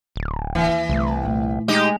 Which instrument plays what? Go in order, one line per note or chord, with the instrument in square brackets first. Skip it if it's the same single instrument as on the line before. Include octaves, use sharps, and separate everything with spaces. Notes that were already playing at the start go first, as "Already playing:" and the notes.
[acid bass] D1
[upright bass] D#2 [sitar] E3
[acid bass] C2 [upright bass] D3 A3
[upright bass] A#2 A3
[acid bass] G#3 [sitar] D#4 G4 D#5